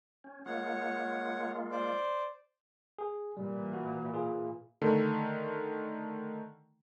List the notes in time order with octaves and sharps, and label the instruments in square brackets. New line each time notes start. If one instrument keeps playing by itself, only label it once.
[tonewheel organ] C#4
[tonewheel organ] G#3 A#3 F4 [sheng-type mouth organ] C#5 F#5
[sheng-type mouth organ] C5 D5
[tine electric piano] G#4
[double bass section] A#2 E3 [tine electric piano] G3
[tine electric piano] F#4
F4 G#4
[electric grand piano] D3 D#3 A3